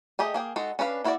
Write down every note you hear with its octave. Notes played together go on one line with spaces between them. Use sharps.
A3 G4 G#4 D#5
A#3 G#4 G5
G#3 D#4 F#4 A4
C#4 D4 B4 F5
A#3 E4 F#4 A#4 D5